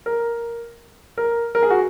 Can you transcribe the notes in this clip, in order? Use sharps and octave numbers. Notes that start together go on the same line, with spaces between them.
A#4
A#4
A#4
G#4
F#4